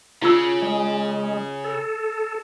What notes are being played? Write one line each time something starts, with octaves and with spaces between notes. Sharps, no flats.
C#3 E4 F4 E6
G#3
A4